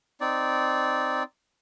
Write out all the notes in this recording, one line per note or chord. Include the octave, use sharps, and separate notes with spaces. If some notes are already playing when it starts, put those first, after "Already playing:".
C4 D#4 D5